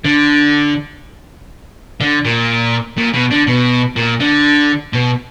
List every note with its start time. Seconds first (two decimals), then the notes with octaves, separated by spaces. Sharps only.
0.05 D3
2.00 D3
2.25 A#2
2.98 A#2
3.14 B2
3.31 D3
3.47 B2
3.96 A#2
4.20 D3
4.93 B2